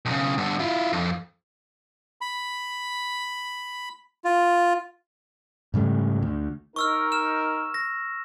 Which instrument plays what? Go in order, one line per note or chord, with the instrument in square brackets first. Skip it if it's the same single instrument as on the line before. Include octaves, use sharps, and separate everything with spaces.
[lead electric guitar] B1 C#3
G2 D3
E4 F4
F2
[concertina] B5
F4
[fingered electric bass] G#2 C#3 G3 A3
D2
[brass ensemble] D#4 A#4 [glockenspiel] C#6 E6 F6
[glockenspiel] F6 E7
A#6